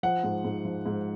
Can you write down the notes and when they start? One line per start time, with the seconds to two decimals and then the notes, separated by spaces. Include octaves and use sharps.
0.03 F3 F#5
0.24 G#2
0.45 G#2
0.65 F3
0.86 G#2